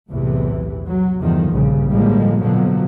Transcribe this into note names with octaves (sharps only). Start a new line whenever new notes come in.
B1 E2 A2 C3 E3
F#3
E2 G2 D3 D#3 F3
A#1 G2 C#3
A2 D3 F3 G3 G#3 A#3
F2 B2 D3 F3 F#3